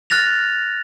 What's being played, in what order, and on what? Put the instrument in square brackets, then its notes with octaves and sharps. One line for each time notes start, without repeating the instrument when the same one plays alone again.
[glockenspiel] F6 F#6 A6 A#6 F7